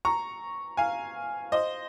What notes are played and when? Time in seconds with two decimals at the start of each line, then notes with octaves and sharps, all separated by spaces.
0.05 A#5 C#6
0.77 F5 G#5
1.52 C5 D#5